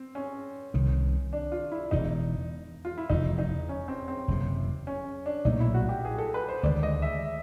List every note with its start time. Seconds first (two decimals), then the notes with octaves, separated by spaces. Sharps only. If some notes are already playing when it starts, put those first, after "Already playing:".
Already playing: C4
0.15 C#4
0.74 C2 C3 D#3
1.33 D4
1.52 F4
1.72 E4
1.91 E1 E2 C#3 D#4
2.85 F4
2.98 E4
3.10 F1 E2 C#3 E3 D#4
3.39 D#4
3.69 C#4
3.88 C4
4.08 C4
4.28 F#1 E2 C3
4.87 C#4
5.26 D4
5.45 B1 A#2 F#3 A3 D#4
5.60 E4
5.74 F#4
5.89 G4
6.05 G#4
6.18 A4
6.34 B4
6.49 C5
6.63 D2 C3 D#3 G#3 D5
6.83 D#5
7.02 E5